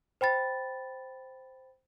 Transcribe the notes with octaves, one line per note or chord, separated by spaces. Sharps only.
C5 G5 B5 A6